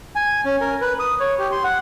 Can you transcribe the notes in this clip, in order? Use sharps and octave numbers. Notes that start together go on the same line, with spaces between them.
G#5
C#4
A#4
B4
D#6
C#5
G4
C6
F#5